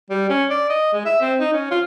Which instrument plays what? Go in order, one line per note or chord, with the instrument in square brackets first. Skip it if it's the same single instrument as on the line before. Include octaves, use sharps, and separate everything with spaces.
[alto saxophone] G3
C#4
D5
D#5
G#3
E5
C4
D#4
C#4
F4